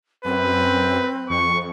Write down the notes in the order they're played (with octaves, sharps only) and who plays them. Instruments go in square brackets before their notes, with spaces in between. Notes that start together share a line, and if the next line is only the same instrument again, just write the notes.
[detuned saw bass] F#2 [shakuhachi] C4 [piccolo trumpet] B4
[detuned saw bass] F2 [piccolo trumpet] C#6